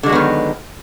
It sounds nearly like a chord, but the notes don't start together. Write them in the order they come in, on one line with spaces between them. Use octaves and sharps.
D3 G#3 F#3 B3 D#3